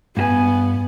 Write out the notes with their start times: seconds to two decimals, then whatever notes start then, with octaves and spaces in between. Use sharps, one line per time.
0.17 G2 B3 F#4 G#5